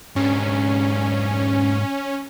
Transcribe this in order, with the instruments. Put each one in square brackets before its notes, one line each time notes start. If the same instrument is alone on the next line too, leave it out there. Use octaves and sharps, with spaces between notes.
[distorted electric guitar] G#2 D4 [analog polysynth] C#4